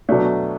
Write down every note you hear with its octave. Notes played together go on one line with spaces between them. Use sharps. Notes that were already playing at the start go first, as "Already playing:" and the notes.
B2 F#3 A3 D4